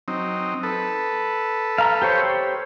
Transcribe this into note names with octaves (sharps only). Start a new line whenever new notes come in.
F#3 C4 D#4
A4 B4
F5 A#5
G4 C5 C#5